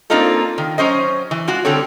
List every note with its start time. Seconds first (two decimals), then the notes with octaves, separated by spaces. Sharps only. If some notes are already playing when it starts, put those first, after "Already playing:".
0.10 A#3 C4 D4 D#4 F4 A4
0.58 D#3
0.78 F#3 C#4 C5 D#5
1.31 E3
1.48 G#3 F4 F#4
1.64 D3 G3 C4 G4 A4 C#5